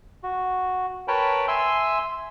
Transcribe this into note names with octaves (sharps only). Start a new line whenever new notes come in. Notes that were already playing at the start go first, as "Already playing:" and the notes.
F#4
A#4 B4 C#5 G5 A5 B5
E5 G#5 C6 E6